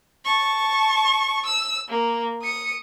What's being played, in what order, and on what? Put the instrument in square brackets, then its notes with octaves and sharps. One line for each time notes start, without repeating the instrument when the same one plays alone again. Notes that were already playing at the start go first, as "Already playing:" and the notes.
[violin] A5 C#6
E6
A#3
D#6 C#7